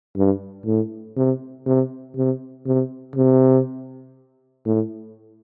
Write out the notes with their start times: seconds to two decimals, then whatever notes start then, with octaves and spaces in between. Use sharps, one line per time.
0.16 G2
0.66 A2
1.17 C3
1.66 C3
2.16 C3
2.66 C3
3.16 C3
4.66 A2